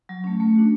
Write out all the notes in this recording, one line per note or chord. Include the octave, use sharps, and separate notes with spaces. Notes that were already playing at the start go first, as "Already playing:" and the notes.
F#3
A3 C#4
A3
D4 F#4